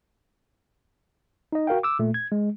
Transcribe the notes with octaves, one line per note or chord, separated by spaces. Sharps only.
D#4 D#5
F#4 A#4 F5 G5
D6 E6
A#2 A3
G#6
G#3